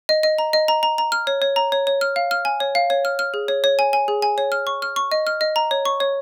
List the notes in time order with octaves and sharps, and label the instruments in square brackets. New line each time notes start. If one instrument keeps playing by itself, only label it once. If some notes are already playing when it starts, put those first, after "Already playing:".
[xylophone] D#5
D#5
A#5
D#5
A#5
A#5
A#5
F6
C#5
C#5
A#5
C#5
C#5
F6
F5
F6
G#5
C#5
F5
C#5
F6
F6
G#4
C#5
C#5
G#5
G#5
G#4
G#5
C#5
F6
C#6
F6
C#6
D#5
F6
D#5
A#5
C#5
C#6
C#5